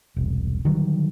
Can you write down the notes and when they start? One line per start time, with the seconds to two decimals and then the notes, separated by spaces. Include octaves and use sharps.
0.16 E1 C2
0.65 D3 D#3 F#3 G3